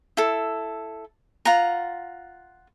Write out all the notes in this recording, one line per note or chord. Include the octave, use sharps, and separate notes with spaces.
E4 A4
F4 F#5 A#5